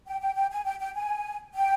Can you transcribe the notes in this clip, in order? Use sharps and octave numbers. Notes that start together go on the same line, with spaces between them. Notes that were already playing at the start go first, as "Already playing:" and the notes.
G5
G5
G5
G#5
G5
G5
G#5
G5